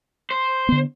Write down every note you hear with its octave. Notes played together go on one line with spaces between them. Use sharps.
C5
D3 B3